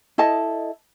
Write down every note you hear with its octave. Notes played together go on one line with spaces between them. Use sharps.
E4 A4 D#5 A5